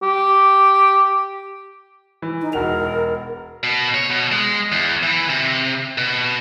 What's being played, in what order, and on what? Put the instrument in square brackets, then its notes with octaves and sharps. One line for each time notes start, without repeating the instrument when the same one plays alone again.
[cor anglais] G4
[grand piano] E3
[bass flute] D#4
[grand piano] E1 F#4 F7 [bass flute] A#4
[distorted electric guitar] B2
C#5
B2
G#3
E2
E3
C3
B2